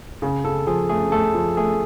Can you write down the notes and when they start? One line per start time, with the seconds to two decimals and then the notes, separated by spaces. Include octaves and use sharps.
0.22 C#3
0.45 C#3 A4
0.67 F3 G#4
0.89 A3 G#4
1.12 A3 A4
1.34 F3
1.57 A3 G#4